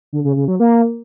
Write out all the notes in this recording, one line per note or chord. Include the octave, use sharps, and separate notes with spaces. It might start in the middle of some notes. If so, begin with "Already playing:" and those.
D3
C#3
C#3
F#3
A#3